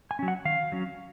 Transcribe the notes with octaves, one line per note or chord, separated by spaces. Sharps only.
G#5
F#3 C#4
F#5
D#3 F5
F#3 C#4